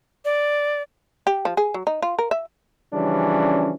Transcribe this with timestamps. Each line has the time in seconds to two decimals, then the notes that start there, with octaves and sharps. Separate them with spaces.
0.25 D5
1.27 G4
1.45 F3
1.57 G#4
1.74 F#3
1.87 D#4
2.02 F4
2.19 A#4
2.31 E5
2.94 C#3 E3 F3 G3 C#4 D4